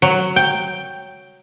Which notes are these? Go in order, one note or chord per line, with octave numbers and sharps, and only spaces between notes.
F#3
G5